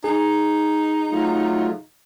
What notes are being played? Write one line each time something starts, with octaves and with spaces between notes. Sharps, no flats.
D#4 G#4
F#3 A3 F4